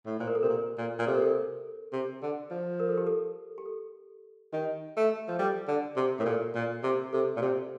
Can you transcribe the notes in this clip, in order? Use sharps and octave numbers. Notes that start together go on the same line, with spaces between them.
A2
A#2 C5
A#4
A4
C3 A#4
A#2
A#2
A#2
C3 A4
A#4
A4
C3
D3
F3
A#4
A4
G4
A4
G4
A4
D#3 G4
A3
F3
G3 A4
D3
C3
A2 A#4
A#2 A4
A#2
C3
C3 A4
A#2
C3